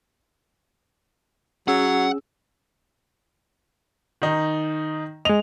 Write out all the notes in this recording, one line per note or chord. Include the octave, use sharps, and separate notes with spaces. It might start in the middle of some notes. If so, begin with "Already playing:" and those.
F#3 C#4 G#4 F#5 E6
D#3 D#4
G#3 D#5 F7